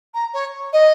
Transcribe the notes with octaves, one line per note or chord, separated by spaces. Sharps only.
A#5
C#5
D#5